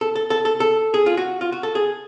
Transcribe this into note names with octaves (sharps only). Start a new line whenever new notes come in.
A4
A4
A4
A4
A4
G#4
F4
F#4
F4
F#4
A4
G#4